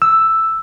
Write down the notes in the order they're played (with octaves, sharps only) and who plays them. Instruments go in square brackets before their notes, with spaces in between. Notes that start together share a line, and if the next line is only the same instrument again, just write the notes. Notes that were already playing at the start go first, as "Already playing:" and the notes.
[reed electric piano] E6